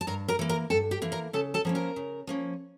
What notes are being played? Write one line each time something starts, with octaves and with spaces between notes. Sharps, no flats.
A5
G2 A#4 A#5
A#4 A#5
E3 A#3
A#4 A#5
G2 A4 A5
G4 G5
E3 A#3
A#4 A#5
C#3 A4 A5
A4 A5
F3 A#3 C#4
A#4 A#5
C#3
F3 A#3 C#4